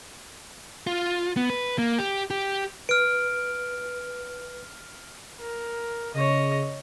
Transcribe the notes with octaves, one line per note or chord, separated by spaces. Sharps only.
F4
B3
B4
A#3
G4
G4
B4 F6 D7
A#4
C#3 C#5 D#5